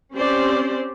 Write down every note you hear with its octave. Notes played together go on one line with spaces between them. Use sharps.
C4 C#4 G4 C5 D5